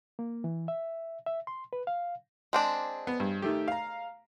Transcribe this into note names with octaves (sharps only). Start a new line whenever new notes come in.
A#3
E3
E5
E5
C6
B4
F5
G#3 C4 D4
B3
G2
D#3 A3 G4
F5 A#5